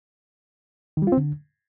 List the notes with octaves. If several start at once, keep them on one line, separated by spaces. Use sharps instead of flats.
D#3
G3
F4
C4
D3